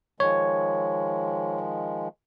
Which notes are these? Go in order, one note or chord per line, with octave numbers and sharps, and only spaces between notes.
D#3 F3 G#3 C#5